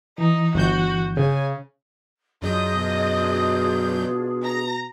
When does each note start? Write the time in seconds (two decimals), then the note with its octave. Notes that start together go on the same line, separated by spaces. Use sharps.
0.18 E3 D#4
0.54 G1 F#4 G6
1.17 C#3 G#5
2.42 F#2 F#3 D4 F4 G#4 D#5 G6
2.73 B2
4.43 A#5 A#6